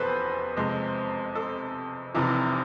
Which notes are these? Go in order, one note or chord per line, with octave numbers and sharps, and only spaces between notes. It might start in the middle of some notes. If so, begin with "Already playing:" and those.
Already playing: F1 E2 B2 A4 B4 C5
F2 C3 G#3
A4
F1 F2 C3 E3